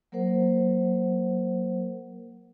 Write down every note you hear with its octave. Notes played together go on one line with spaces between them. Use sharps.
F#3 A#3 A#4 C5 F#5